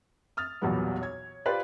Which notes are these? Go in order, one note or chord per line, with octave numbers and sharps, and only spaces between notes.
D#6 F6 A6
B1 E2 A#2 F#3 G3 B3
C#5 G#6
F4 G4 B4 C5 D5